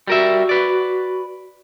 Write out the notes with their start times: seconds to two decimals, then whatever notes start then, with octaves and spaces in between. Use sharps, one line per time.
0.07 G3 F#4 A#4 E5
0.49 B4 D5